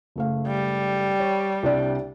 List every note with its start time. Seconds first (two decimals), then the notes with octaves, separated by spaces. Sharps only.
0.16 F#1 A3 F5
0.48 G3
1.19 C#5
1.63 C2 D4 D5